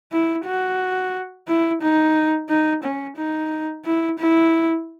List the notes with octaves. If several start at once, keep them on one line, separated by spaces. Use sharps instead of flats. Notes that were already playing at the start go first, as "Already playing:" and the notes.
E4
F#4
E4
D#4
D#4
C#4
D#4
E4
E4